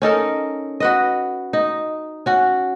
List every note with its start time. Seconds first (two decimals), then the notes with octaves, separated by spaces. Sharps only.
0.02 C#4 D#4 A4 A#4
0.80 F#4 B4 D#5
1.53 D#4
2.26 C#4 F#4